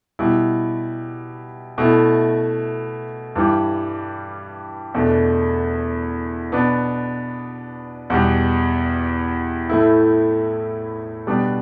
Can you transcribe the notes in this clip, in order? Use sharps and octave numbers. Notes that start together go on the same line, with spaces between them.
B2 G3 E4
B2 A3 E4
G2 E3 G3
E2 B2 A3 D4
B2 B3 D4
E2 B2 G3
A2 A3 E4
B2 G3 B3 D4